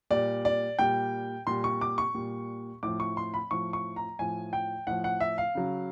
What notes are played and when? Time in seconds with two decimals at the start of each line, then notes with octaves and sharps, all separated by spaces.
0.11 A#2 G3 D5
0.45 D5
0.79 A#2 G3 G5
1.47 A#2 G3 C6
1.64 C#6
1.81 D6
1.98 C#6
2.15 A#2 G3
2.83 A2 F3 D6
3.00 C#6
3.17 C6
3.34 B5
3.51 A2 F3 C#6
3.73 C#6
3.96 A#5
4.19 A2 F3 G#5
4.53 G5
4.87 A2 F3 F#5
5.04 F#5
5.21 E5
5.38 F5
5.55 C#3 F#3